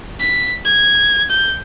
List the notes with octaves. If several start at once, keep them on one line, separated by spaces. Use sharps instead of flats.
B6
G#6
G6